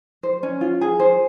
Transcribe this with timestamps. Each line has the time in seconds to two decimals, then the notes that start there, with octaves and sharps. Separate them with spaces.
0.23 C5
0.43 C#4
0.61 F4
0.81 G#4
1.00 C5